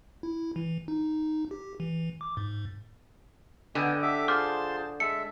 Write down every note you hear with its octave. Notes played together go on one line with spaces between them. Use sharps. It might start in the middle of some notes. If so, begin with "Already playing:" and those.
E4
E3
D#4
G4
E3
D6
G#2
D3 B3 D#5 G5 G#5
G4 A4 E5 D6
F4 G#4 C5 A5 C6 D6 F6 G6
G#3 E5 A5 E6 C#7